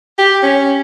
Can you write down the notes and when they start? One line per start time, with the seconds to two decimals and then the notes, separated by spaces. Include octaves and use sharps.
0.18 G4
0.43 C#4